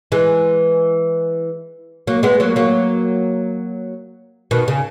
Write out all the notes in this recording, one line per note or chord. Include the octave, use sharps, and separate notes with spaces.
E3 G#3
F#3 A#3
G#3 B3
F#3 A#3
F#3 A#3
B2 D#3
C#3